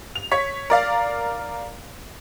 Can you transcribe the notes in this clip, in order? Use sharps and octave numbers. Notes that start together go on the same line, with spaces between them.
F7
C#5 B6
A#4 D5 F5